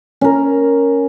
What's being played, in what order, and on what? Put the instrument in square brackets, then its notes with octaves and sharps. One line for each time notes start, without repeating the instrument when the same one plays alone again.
[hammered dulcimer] C#4 A#4